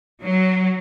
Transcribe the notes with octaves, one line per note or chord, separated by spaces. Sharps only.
F#3